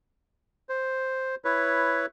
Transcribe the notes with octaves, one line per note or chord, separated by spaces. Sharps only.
C5
E4 B4 C#5